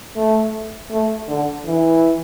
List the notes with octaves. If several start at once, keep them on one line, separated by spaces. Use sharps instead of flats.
A3
A3
D3
E3